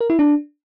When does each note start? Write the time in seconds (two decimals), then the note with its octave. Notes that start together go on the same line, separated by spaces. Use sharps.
0.01 A#4
0.10 E4
0.19 D4